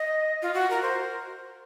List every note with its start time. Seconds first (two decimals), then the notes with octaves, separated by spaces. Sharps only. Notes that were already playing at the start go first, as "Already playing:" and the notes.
Already playing: D#5
0.42 F4
0.54 F#4
0.70 A#4
0.83 C5